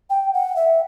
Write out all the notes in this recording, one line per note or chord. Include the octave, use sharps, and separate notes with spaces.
G5
F#5
E5